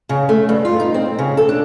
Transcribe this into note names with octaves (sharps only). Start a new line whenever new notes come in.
C#3
A3
G2
F4
D#4
C4
C#3
A4
D4